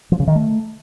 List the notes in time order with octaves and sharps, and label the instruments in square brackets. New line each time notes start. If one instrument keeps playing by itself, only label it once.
[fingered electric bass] F3
C#3
D#3
A3